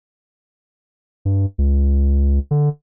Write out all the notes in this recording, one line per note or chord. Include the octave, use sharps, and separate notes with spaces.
G2
C#2
D3